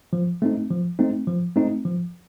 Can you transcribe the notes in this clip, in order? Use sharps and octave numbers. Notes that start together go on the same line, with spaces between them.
F3
A3 C4 D#4
F3
A3 C4 D#4
F3
A3 C4 D#4
F3